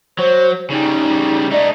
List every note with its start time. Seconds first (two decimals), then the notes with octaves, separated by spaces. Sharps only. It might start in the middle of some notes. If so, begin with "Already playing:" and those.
0.19 F#3 C5
0.70 C#3 G3 D#4
1.52 A3 D#4 D5